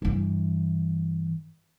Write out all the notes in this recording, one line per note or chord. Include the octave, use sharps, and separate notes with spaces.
G2 E3